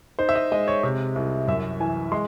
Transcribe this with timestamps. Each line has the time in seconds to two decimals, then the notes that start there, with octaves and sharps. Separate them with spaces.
0.19 D#4 C5
0.29 E5
0.35 D#5
0.52 G#3 D#5
0.68 C#5
0.83 C3
1.16 C2
1.47 F#2 E5
1.80 E3 G#5
2.12 G#3 C6